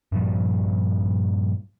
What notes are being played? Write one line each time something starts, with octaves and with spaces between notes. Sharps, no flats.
G2 A#2 F3 G3